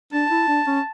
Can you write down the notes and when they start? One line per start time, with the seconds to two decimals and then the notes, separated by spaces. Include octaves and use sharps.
0.13 D4 A5
0.30 E4
0.48 D4
0.67 C#4